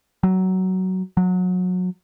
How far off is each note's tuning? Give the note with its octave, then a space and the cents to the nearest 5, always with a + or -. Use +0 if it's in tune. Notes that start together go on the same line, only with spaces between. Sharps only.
F#3 +15
F#3 -25